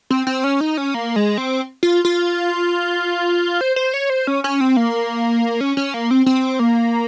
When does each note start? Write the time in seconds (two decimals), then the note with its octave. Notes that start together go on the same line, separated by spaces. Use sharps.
0.10 C4
0.27 C4
0.44 C#4
0.61 D#4
0.77 C#4
0.94 A#3
1.16 G#3
1.38 C4
1.83 F4
2.05 F4
3.61 C5
3.76 C5
3.94 C#5
4.10 C5
4.27 C#4
4.44 C#4
4.61 C4
4.77 A#3
5.61 C#4
5.77 C#4
5.94 A#3
6.11 C4
6.26 C4
6.59 A#3